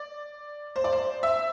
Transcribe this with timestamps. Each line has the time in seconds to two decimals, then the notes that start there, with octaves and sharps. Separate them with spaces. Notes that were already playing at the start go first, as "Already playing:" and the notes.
Already playing: D5
0.76 C5
0.84 D5
0.92 C5
1.23 E5